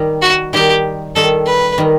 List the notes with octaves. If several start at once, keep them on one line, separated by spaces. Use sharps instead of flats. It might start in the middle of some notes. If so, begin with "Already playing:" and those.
Already playing: D#3 G3 D#4
F#4
D#3 G3 D#4 G4
D#3 G3 D#4 A4
B4
D#3 G3 D#4